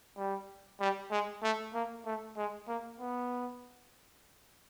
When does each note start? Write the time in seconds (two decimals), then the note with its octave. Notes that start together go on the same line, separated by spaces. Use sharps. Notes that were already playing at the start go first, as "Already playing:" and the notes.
0.17 G3
0.80 G3
1.11 G#3
1.43 A3
1.74 A#3
2.05 A3
2.37 G#3
2.68 A#3
3.00 B3